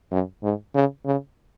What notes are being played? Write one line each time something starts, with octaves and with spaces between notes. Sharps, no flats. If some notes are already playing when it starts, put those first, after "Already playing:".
F#2
G#2
C#3
C#3